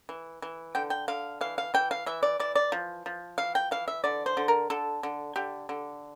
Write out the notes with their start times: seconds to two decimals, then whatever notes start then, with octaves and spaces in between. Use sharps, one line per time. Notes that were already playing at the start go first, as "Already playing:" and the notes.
0.09 E3
0.42 E3
0.75 D3 G5
0.90 G5
1.08 D3 F5
1.41 E3 F5
1.58 F5
1.74 E3 G5
1.91 F5
2.06 E3 E5
2.23 D5
2.40 E3 D5
2.55 D5
2.72 F3
3.06 F3
3.38 E3 F5
3.55 G5
3.71 E3 F5
3.88 E5
4.04 D3 D5
4.26 C5
4.37 D3
4.48 A#4
4.70 D3 A4
5.03 D3
5.36 D3 G4
5.69 D3